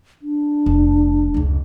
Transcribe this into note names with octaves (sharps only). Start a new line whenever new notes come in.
D4
F1
F1 C#2